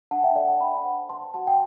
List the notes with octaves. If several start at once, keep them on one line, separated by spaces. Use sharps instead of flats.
D4 F#5 A5
E5 G5
A4 D5 F#5
F#5 A5
D4 G5 B5
F#5 A5
C5
B4 A5 C6
F#4 F#5 A5
G5